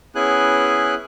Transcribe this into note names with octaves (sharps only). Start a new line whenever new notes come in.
B3 C#4 E4 G#4 G#5 F#6